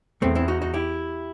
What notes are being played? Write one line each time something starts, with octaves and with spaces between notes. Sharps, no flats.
E2 A3 C4
C4 E4
D#4 F#4
D#4 F#4
E4 G4